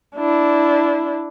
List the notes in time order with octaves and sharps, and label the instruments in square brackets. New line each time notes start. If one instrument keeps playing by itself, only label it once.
[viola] D4 E4